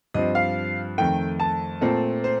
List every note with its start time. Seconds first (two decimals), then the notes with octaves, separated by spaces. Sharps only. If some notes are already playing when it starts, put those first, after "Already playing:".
0.14 G2 F3 C4 D#5
0.35 F5
0.98 F2 D#3 A3 G5
1.40 A5
1.81 A#2 A3 C4
2.24 C5